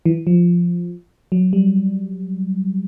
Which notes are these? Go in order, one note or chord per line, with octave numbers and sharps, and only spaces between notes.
E3
F3
F#3
G3